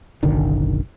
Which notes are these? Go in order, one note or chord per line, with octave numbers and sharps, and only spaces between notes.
F#1 B1 D3 D#3